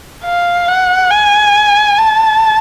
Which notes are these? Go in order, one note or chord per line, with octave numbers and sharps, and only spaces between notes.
F5
F#5
G#5
A5